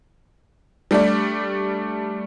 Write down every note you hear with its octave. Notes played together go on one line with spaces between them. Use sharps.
G3 A3 D4 D5